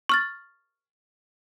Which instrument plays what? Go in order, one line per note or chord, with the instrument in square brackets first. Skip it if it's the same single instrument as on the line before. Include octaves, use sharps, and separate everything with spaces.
[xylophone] C#6 F6 A6